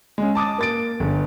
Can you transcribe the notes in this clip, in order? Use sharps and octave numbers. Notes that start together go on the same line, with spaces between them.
G#3 C#4
A5 D6 D#6 A6
A#3 A6 D7
G1